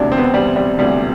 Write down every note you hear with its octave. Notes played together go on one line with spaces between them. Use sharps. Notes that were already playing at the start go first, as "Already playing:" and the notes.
Already playing: E1 D2 C3 D4
C4
B3
C4
G3
G3
E1 D2 C3 G3